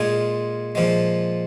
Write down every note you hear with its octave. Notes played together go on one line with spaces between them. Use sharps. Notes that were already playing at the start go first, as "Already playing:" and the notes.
Already playing: A#2 G#3 F4 G#4
A#2 F3 G#3